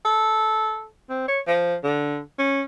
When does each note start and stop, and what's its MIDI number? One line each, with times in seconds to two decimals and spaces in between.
0.05 0.86 69
1.10 1.26 60
1.28 1.40 73
1.47 1.75 53
1.84 2.19 50
2.39 2.62 61